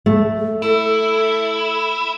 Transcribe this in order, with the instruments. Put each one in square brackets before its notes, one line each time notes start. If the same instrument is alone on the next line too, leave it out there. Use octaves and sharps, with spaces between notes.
[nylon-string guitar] A3
[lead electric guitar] E4 [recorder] A4